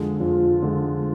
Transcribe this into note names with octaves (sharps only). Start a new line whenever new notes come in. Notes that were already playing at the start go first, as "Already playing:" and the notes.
Already playing: F2 D3 G#3
F2 F4
D3 G#3